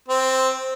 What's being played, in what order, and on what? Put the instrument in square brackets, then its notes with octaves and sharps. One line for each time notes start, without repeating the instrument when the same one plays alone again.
[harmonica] C4